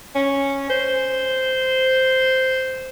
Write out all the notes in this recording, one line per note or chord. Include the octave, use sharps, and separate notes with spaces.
C#4
C5